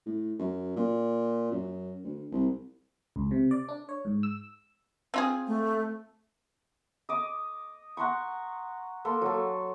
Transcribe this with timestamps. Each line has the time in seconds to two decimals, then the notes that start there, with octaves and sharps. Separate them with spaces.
0.06 A2
0.39 F#2
0.76 A#2
1.51 F#2
2.04 D2
2.32 C2
3.16 C#2
3.31 C3
3.51 D5
3.69 D4
3.89 C#5
4.05 G#2
4.23 E6
5.14 C4 F4 G#4
5.47 A3
7.09 D#5 D6
7.97 F#5 A#5 C6 C#6
9.05 A#3 A4 C6
9.21 F#3 A4